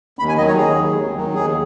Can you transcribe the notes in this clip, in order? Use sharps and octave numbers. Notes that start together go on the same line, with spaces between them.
D#2 B5
G#5
D#3 F#3 D#5
C#5
D#2 G#4
D#3 F#3
D#2
D#3 F#3
D#2 G#4